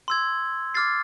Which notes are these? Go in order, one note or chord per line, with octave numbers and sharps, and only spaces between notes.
C6 E6 G#6
D6 F6 A6 C7